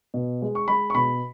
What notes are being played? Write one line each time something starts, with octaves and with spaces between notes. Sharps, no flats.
B2
G#3
C#6
G#3 B5
C#6
B2 B5